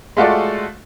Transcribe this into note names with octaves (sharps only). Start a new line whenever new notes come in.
G#3 A3 F4 F#4 A4 D5